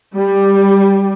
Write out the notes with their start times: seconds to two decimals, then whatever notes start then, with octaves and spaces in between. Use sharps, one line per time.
0.17 G3